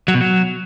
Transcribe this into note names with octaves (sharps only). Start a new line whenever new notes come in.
F#3
B2
F#3